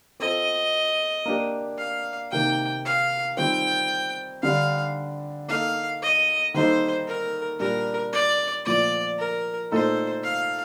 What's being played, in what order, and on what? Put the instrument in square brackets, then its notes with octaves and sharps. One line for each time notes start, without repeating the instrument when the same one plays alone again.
[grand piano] C4 F4 A4 C5 [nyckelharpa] D#5
[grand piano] A#3 D4 G4 A#4
[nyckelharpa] F5
[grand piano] C3 D#3 A#3 D#4 A#4 [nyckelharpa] G5
[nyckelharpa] F5
[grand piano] D#3 G3 C4 F4 [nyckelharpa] G5
[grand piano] D3 G3 D4 G4 D5 [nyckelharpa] F5
[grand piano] A#3 D#4 A4 D#5 [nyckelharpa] F5
[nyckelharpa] D#5
[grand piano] D#3 G3 A#3 D#4 A4 [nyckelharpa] C5
[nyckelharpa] A#4
[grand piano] A#2 G3 D4 G4 [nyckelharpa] A#4
[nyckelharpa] D5
[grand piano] A#2 F3 A3 [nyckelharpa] D5
[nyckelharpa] A#4
[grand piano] A#2 A3 D#4 A4 [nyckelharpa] C5
[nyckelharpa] F5